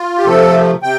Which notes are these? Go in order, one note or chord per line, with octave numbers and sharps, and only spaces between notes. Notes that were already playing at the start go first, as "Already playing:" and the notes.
Already playing: F4
G4
C3 F3 A3 A4
C3 G5